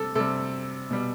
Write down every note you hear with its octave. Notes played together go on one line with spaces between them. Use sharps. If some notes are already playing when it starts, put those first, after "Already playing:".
Already playing: C3 G3 A4
C3 G3 A4
B2 G3